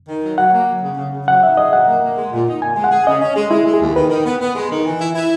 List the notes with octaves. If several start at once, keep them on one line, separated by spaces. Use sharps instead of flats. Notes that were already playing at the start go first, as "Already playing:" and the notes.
D#3
F#3
F#3 F#5
A#3
F#3
C#3
C#3
C#3
F#3 F#5
D#4 E5
G#4 D#5
F#3 F#5
A#3
A#3
G#3
A#2
D#4
A#2 G#5
G#3
F#5
G#4
C#3 D#5
C#4
G#3
G#3 E4
G#3
G#4
D#2
D#3 B4
D#3
B3
B3
G#3
D#3
E3
E4
E4